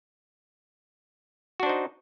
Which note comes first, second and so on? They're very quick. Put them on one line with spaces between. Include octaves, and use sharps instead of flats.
F#4 D4 C5 D#4